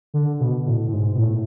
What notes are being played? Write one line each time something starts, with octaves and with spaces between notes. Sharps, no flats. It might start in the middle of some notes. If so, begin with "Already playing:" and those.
D3
B2
A2
A2
G#2
B2
A2